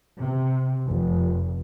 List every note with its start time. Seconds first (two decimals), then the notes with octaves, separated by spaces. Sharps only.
0.18 C3
0.87 F1